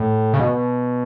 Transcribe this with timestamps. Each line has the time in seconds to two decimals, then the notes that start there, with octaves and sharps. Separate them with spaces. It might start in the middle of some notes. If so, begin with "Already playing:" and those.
Already playing: A2
0.34 C#3
0.40 B2